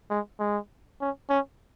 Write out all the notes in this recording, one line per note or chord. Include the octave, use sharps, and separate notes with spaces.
G#3
G#3
C#4
C#4